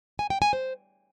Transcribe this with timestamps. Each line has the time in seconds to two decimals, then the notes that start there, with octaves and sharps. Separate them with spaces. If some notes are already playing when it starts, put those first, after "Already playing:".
0.19 G#5
0.30 G5
0.42 G#5
0.53 C5